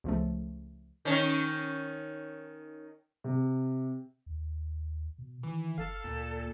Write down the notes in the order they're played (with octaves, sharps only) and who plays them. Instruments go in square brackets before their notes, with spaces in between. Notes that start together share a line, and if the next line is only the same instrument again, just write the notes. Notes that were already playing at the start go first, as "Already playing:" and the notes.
[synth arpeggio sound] C#2 F3 A3
[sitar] D#3 C#4
[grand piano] C3
[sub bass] D#2
B2
[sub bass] D#3 [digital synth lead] E3
[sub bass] F#1 [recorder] A4 [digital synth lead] F5
[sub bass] D2 [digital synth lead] A#2